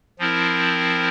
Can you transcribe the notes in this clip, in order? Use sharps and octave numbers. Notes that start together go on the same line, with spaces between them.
F3 C4 E4 A#4